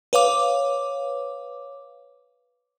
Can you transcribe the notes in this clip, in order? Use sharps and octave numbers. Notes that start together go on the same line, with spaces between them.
B4 C#5 F5 D6